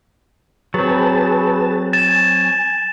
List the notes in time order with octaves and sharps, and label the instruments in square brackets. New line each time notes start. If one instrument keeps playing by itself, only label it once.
[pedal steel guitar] F#3 C4 [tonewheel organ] G#4 B4 A5
[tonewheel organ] G#5 [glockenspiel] A6 E7